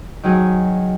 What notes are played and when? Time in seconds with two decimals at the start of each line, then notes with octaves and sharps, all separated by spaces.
0.23 D#3 F#3 G#4